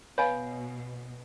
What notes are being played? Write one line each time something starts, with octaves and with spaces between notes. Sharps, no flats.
B2 B4 C#5 F5 G#5 B5